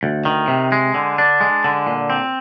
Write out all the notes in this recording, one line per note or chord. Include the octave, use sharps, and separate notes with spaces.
D2
D#3
C3
G#3
D3
D4
G#3
D3
A#2
C4